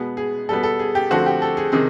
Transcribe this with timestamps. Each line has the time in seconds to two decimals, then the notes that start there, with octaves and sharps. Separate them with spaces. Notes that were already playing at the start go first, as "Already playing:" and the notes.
Already playing: B2 G#3 B3
0.17 G#4
0.49 B2 G3 B3 A4
0.63 A4
0.79 G#4
0.95 G4
1.10 D3 F3 A3 C4 F#4
1.26 G4
1.42 A4
1.57 G#4
1.72 C3 D#3 G#4